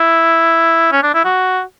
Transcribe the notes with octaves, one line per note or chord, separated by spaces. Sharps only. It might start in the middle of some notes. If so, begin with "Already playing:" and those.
Already playing: E4
C#4
D4
E4
F#4